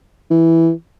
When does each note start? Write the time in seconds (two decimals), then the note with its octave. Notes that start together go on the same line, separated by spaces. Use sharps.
0.31 E3